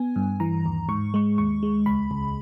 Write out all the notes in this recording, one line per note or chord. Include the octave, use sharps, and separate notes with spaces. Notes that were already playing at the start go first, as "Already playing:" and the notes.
Already playing: B3 G#5
G2
E3 A#5
D#2
G#2 C#6
G#3 C#6
D#2 C#6
G#3
C#2 B5
C#2